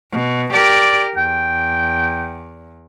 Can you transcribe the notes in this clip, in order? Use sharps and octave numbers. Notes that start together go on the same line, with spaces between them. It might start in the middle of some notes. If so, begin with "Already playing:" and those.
B2
G4 A#4 D5
E2 G5